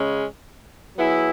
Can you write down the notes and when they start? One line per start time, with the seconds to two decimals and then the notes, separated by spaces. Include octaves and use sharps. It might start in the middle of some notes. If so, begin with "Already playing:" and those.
Already playing: C#3 G#3 C#4
0.96 F#3 B3 E4 G#4